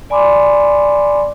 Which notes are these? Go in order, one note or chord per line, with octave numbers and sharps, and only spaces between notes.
D5 G#5 B5 C6 D6